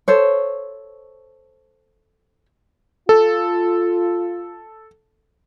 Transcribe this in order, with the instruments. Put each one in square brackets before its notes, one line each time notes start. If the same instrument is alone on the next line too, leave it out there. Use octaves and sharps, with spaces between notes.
[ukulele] A4 C5 C#5
[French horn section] F4 [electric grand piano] A4